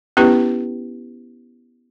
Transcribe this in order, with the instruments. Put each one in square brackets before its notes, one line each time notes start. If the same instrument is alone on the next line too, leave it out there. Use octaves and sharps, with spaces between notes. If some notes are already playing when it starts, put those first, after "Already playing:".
[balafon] B3 C#4 E4 G4 B4